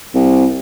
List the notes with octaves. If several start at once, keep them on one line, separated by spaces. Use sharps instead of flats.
C2